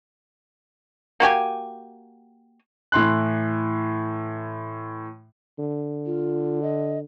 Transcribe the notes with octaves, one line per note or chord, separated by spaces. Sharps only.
A#3 F#4 G4 G#5
A2 E3 C6 F#6
D3
F4
D#5